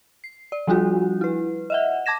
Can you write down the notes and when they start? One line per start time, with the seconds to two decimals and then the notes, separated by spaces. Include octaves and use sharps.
0.24 C7
0.52 D5
0.67 F3 G3 D4 F4 F#4
1.21 E4 B4
1.70 D#5 E5 F#5
2.06 A5 D6 G#6 A#6 E7